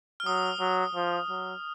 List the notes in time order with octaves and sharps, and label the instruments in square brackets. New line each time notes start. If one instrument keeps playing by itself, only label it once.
[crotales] F6
[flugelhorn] F#3 [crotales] D#6
[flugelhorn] F#3
F3
F#3